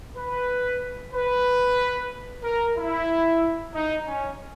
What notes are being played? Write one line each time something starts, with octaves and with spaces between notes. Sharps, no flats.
B4
B4
A#4
E4
D#4
C#4